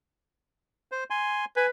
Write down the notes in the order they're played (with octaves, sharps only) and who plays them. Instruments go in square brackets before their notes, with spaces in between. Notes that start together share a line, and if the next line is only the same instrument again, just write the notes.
[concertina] C5
G#5 C6
[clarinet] B4 [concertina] G#5